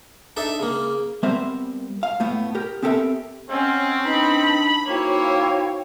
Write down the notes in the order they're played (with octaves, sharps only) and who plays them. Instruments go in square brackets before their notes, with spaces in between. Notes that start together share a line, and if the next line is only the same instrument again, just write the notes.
[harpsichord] D4 D#4 A4 E5
C#3 A#3
[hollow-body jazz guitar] G3 B3 C4 A#4 C5 E5
F5
A2 A3 B3
G4 A#4
B3 C4 G4 A4 A#4 E5
[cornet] C4 [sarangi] C#4 [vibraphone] D#5 F#5 G5
[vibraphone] D4 B4 [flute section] D#4 A5 [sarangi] B5
[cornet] A#3 [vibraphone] D#4 F#4 C5 [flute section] E4 F5 G5 [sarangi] C#5